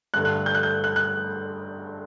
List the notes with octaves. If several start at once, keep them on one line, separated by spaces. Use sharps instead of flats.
G2 D3 A3 F#6
F#6
G6
F#6
G6
F#6
F#6